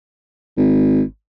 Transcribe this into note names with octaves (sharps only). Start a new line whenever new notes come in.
G#1